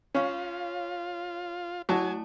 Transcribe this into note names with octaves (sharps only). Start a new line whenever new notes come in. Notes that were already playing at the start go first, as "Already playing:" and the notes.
C#4 F4 C#5 F5
F#3 A3 E4 F#4 G#5 A5